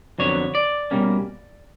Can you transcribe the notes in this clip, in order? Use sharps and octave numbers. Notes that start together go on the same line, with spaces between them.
F2 D3 F#3 B3 C#5
D5
B2 G3 A#3 C#4